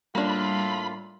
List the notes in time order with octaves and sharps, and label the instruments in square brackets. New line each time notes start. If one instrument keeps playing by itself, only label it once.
[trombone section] A2 F4 [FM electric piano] G3 [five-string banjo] A#3 D4 [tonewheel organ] B5